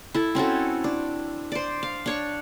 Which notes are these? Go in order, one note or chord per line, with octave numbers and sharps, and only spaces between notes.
E4 A4
C4 C#4 F#4 A4
D4
C5 D5
F5
D4 C#5 C#6